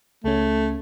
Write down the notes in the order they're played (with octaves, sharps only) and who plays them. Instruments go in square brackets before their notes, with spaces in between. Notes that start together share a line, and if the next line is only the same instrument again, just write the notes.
[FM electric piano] C#2 C#4 [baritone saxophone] A3